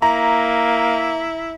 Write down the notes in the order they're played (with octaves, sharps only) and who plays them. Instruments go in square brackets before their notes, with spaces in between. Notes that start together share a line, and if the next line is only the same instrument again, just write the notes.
[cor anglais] A#3 [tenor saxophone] E4 [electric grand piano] A#5